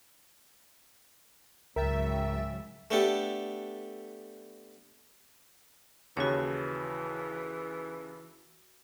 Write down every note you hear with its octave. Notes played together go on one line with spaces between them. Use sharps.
C#2 G#2 C#3 F#3 A#4 E5 G5 A6
A3 B3 D4 G4 A4
D#2 C#3 E3 F#4 C#5